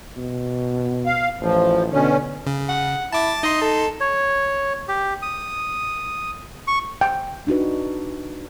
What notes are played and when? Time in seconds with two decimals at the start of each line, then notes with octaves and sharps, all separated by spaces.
0.17 B2
1.06 F5
1.41 A1 F3
1.92 B2 D3 C#4
2.47 C#3
2.69 F#5
3.12 E4 A5 D6 A6
3.43 D#4 D#5 C6
3.61 A4
4.00 C#5
4.88 G4
5.22 D#6
6.67 C#6
7.01 G5
7.47 D4 D#4 F#4 B4